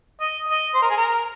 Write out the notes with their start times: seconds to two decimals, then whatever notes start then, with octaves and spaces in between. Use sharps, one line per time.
0.21 D#5
0.49 D#5
0.75 C5
0.82 A#4
0.90 G#4
0.97 A#4